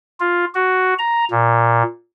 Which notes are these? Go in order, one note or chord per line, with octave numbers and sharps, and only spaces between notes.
F4
F#4
A#5
A#2